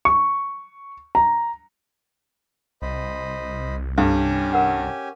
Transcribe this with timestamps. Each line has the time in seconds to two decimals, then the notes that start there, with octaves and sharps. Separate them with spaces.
0.05 C#6
1.15 A#5
2.82 C2 C5 D#5 B5
3.98 G2 C#4 G4 A4 F5 G5 G#5
4.52 A#4 F#5 G5